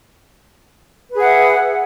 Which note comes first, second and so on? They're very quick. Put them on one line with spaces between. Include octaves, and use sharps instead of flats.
B4 G#4 F#5 E5